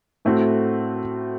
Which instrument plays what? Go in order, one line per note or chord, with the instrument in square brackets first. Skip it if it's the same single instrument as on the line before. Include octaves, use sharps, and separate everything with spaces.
[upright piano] A2 A3 C4 F#4